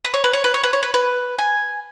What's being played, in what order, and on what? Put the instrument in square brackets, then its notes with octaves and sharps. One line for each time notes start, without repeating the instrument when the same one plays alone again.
[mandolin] B4
C#5
B4
C#5
B4
C#5
B4
C#5
B4
B4
G#5